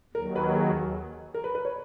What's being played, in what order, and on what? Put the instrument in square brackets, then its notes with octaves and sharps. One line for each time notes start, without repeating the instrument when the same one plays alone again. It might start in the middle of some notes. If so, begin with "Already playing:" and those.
[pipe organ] D#2 D#3 F#3 [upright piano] A#4
[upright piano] B4
G#4
A#4
B4
B4
C#5